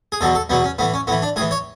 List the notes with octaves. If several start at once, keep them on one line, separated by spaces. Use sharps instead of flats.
G#4
E2 B2 F#3 A4
A4
E2 B2 F#3 B3
C#4
A2 E3 B3
C#4
A2 E3 B3
D4
A2 E3 G#4
C#5